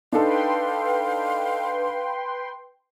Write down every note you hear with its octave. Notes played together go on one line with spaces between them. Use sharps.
D4 D#4 A4 B4 F5 G5 C6